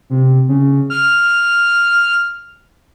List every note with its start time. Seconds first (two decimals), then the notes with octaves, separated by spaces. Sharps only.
0.10 C3
0.48 C#3
0.90 F6